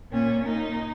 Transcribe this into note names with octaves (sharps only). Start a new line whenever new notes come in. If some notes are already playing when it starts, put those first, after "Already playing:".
A#2 C#4
A#2 D#4